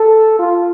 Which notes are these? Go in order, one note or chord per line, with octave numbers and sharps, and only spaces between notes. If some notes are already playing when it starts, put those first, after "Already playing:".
Already playing: A4
F4